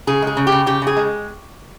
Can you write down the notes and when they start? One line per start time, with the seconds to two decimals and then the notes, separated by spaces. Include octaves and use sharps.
0.07 C#3 G#4
0.22 G#3 G#4
0.37 C#3
0.47 G4
0.52 C#3
0.66 C#3 G4
0.82 C#3 G#4
0.97 G#3